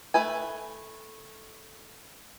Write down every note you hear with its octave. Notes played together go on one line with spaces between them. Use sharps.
A3 B4 G#5